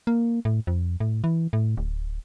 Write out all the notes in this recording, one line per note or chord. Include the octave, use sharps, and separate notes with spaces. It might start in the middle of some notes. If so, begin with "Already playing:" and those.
A#3
A2
F2
A2
E3
A2
D1